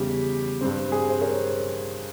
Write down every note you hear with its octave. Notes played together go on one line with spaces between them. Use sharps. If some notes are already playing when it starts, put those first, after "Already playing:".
Already playing: E2 C#3 G3 G4
G2 G3 C4
G#4
C5
A#4 C#5